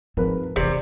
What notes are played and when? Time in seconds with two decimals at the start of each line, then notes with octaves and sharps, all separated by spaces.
0.17 G#2 F3 C4 A#4 B4
0.56 E1 C3 E3 D5